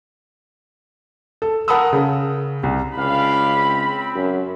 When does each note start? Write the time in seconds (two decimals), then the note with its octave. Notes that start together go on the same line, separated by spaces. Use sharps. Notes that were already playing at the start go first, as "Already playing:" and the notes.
1.42 A4
1.68 A#4 F#5 A5 B5 D#6 E6
1.93 C#3
2.63 C2
2.98 C#2 D4 G4 F5 B5
3.56 C4
4.16 F#2